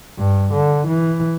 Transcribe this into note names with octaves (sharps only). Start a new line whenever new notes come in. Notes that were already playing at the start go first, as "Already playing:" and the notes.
G2
D3
E3